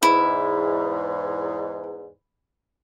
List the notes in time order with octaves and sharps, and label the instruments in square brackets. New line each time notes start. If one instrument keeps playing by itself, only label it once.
[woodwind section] E2 G#2 [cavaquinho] E4